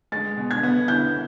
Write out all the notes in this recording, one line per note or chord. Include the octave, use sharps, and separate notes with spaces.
G#3 A6
B2
G#6
B3
E4 G6